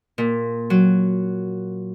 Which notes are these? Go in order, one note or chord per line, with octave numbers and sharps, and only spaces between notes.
A#2
F#3